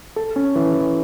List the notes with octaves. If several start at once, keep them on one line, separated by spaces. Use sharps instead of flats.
A4
C#4
E3
E3